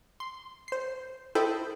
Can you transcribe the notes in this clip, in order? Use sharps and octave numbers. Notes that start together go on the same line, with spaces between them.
C6
C5 C7
E4 A4 C5 D#5 G5 B5